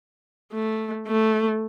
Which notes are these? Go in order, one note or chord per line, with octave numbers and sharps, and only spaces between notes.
A3
A3